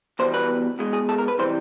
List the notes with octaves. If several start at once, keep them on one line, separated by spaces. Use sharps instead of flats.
E2 B2 G3 C5
B4
B2 G#3
G#4
A4
A#4
B4
C3 E3 G3 C5